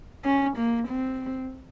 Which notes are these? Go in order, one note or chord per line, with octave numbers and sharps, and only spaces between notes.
C#4
A#3
C4